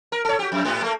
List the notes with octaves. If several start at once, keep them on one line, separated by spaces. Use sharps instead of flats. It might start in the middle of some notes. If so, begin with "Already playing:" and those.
A#4
A4 C#5
F#4 G4
F2
G#2 B3 G4
A3 A#3